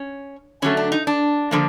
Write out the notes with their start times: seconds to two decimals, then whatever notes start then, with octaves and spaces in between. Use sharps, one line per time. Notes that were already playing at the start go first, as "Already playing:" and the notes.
Already playing: C#4
0.62 D3 F#3 A3 C#4
0.77 D4
0.92 D#4
1.07 D4
1.51 D3 F3 A#3